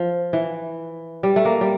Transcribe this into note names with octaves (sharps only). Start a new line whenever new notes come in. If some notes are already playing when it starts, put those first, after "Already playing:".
Already playing: F3
E3
G3
A3
A#3
G3